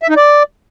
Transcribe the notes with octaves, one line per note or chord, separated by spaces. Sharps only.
E5
D#4
D5